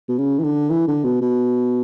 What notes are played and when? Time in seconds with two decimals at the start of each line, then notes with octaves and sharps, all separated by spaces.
0.09 B2
0.18 C#3
0.39 E3
0.44 D3
0.70 E3
0.88 D3
1.04 B2
1.21 B2